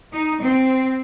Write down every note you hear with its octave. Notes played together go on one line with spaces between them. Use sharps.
D#4
C4